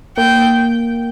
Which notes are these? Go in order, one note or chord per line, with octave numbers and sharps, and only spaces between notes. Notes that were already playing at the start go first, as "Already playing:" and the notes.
A#3 G5